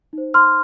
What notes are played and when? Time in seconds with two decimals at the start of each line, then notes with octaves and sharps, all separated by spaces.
0.13 D#4 C5
0.34 C6 F6